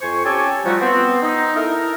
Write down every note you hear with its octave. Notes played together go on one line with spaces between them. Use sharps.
F2 C5 G#5 C#6
C#4 G4 A4 G5 G#5
F3 G3 A3 D#4 F#4
B3 C4
D#4
E4 A4 A#4